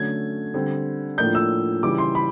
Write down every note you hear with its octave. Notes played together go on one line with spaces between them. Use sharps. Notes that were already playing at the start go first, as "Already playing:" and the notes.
Already playing: D3 F#3 A3 C#4 G#6
D3 G3 C4
A2 F3 A#3 D4 G6
E6
C#3 E3 G3 D6
C6
B5